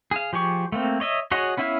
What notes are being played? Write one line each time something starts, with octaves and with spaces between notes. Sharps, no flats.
G#4 F5
F3 G4 G#4 C#6
A3 A#3 C4
C#5 D#5 E5
F#4 G#4 C#5 D#5 F#5
B3 C#4 E4 E5 F5